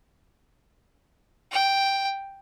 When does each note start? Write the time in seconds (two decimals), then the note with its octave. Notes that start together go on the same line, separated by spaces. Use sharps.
1.52 G5